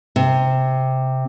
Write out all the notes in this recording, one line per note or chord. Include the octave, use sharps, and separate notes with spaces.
C3